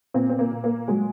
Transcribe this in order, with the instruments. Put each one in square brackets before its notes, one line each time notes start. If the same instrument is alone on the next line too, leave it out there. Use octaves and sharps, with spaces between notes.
[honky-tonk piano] A#2 C4
C4
A#3
A#2
A#3
F#3 G#3